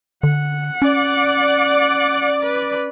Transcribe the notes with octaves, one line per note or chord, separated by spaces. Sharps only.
D3 F#5
C#4 D5
B4